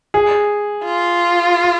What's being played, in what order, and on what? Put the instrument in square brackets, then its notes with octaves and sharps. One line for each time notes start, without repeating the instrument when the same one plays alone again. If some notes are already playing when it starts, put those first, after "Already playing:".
[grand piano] G#4
[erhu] F4